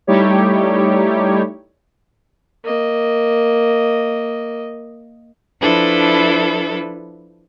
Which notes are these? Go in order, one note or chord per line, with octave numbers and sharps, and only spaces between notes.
G3 A3 D#4 E4 G4 C#5
A#3 D#5
F3 D4 E4 A4 B4